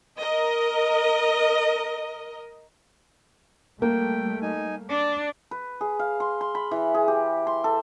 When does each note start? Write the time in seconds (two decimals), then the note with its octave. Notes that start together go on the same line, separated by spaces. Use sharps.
0.18 A#4 D#5
3.82 G3 A3 A#3 G5
4.42 D#4 G#5
4.89 D4 D6
5.51 B4
5.81 G#4
5.99 F5
6.20 C6
6.41 C6
6.55 B5
6.71 E3
6.94 G#4
7.08 G4
7.47 C6
7.64 A4